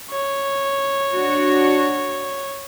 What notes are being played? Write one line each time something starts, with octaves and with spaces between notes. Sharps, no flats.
C#5
D4 F#4